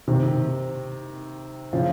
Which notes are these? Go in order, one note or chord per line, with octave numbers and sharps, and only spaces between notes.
C3 D#3
C#3 F3